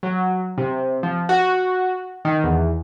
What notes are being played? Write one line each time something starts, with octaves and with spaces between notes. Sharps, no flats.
F#3
C3
F3
F#4
D#3
E2